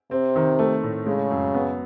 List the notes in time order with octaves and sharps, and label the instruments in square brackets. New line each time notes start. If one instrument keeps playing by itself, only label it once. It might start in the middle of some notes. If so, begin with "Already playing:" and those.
[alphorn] C3 [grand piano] C4
[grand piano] D#3
A3
A2
[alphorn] C#3 [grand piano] G#3
[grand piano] F#2
B3